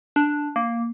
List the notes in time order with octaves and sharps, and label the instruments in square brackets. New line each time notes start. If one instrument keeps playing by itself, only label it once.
[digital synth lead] D4
A#3